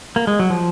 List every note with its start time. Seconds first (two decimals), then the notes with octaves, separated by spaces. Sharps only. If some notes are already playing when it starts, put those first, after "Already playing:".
0.16 A#3
0.27 G#3
0.39 F#3
0.50 F3